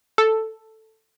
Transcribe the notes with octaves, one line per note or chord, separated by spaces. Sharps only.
A4